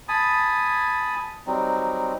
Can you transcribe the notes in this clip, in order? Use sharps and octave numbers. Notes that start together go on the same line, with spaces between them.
G#5 A5 B5 D#6
F#3 G3 C4 D#4